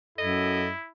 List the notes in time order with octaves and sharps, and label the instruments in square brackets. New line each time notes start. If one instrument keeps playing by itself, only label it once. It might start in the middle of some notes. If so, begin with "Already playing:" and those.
[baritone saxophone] F#2 [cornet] E4 [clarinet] A4 [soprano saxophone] D#5